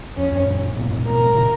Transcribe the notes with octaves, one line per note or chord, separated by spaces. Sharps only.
F2 C#4
F#2
F#2 A#2
G#2 B2
G#2 B2
G#2 B2 A#4
A#2 C#3